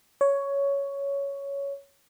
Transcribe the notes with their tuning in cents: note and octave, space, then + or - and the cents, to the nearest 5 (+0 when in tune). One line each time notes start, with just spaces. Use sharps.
C#5 +10